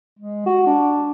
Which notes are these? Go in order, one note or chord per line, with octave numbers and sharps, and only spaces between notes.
G#3
F#4
D4